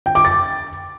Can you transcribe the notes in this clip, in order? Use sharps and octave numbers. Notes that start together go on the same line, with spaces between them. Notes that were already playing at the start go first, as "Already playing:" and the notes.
G5
D6
A6